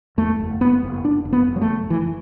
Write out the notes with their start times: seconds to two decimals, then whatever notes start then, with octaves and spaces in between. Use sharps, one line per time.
0.18 E2 A3
0.39 F#1
0.60 F#1 B3
0.83 F#1
1.04 F#1 D4
1.25 F#1
1.33 B3
1.47 F#1
1.56 F#3
1.61 A3
1.68 F#1
1.90 F#1 E3